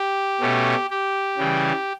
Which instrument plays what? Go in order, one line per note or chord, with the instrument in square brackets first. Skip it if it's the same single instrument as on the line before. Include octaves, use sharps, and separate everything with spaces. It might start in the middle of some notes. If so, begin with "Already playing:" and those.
Already playing: [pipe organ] G4
B2 A3 C#4
G4
C#3 E3 G3